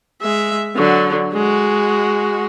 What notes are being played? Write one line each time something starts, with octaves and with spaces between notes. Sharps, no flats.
G#3 E5
D3 F#3
G#3 F#4